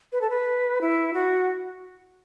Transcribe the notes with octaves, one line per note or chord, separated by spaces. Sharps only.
B4
A4
B4
E4
F#4